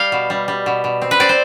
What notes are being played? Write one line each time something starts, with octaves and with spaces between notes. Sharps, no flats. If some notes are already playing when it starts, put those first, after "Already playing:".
Already playing: G3 F5 G5
B2
G3
G3
B2
B2
C4
B4
C4 D5
C5